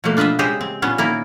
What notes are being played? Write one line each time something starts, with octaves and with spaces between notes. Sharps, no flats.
B2 F3 F#3 A3 A#3
D4 F4 B4 D#5 E5
C#3 G#3 G4 C5 D#5 E5
C4
A#2 B3 C#4 F4
D#3 A#3 E4 A#4